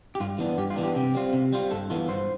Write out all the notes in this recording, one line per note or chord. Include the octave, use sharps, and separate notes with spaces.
G4
G2 F4
E3 B3 D4
G2 G4
F4
E3 B3 D4
G4
C3 G4
G3 C4 F4
C3
G3 C4 F4
G2 A4
E3 B3 F4 A4
G2 C5